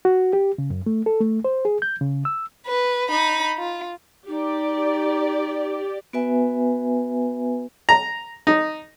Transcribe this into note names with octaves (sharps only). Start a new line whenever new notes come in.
F#4
G4
C#3
F#2
A3
A4
A3
C5
G#4
G6
C#3
E6
B4
D#4 B5
F4
D#4 G4 D5
B3 F#4 B4 E5 G#5
A#5
D#4